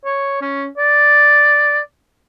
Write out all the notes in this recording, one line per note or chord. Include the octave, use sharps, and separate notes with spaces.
C#5
C#4
D5